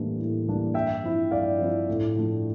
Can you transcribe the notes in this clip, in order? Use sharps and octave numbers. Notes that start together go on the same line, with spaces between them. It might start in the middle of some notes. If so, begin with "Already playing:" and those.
Already playing: A2 E3 G3 A#3 D4
A2
E3 G3 A#3 D4
G2 E5 G5
F3 C4 E4
G2 D5 F5
F3 C4 E4
A2
F3 A3 D4